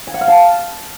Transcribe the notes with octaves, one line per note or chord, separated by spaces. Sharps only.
G#5
F#5
F5
A5